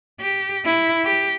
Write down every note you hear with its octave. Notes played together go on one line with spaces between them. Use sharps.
G4
E4
G4